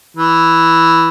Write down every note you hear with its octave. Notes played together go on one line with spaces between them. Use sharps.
E3